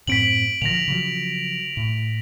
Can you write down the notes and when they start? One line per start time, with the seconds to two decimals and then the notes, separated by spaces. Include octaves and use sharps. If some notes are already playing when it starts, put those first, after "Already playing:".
0.07 F#2 A2 C4 B6 D7 F#7
0.62 A#2 D3 F3 A#6 F7
0.88 C#3 F3 F#3
1.77 A2